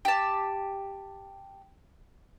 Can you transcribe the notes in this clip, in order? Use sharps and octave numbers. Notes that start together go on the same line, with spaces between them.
G4 A5